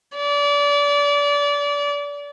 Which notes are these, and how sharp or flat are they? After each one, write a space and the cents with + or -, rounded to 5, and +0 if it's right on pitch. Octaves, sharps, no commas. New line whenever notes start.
D5 -30